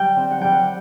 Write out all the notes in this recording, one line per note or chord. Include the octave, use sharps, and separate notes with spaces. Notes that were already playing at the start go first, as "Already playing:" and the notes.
Already playing: G3 G5
C4
F#5
G3 G5
F#5